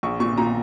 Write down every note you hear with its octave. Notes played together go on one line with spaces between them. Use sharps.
A#1 C#6
A#2 C#6
A#2 A#5